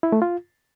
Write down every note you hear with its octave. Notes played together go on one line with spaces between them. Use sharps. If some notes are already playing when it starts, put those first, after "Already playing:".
E4
A3
F4